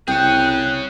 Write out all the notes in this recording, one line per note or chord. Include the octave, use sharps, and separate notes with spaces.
C2 G#4 C#5 G5 F#6